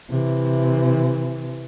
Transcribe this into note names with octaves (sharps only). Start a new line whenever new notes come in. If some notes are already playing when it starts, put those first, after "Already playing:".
C3 E3